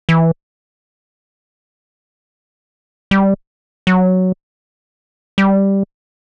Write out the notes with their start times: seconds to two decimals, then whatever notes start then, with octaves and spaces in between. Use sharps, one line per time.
0.09 E3
3.11 G3
3.87 F#3
5.38 G3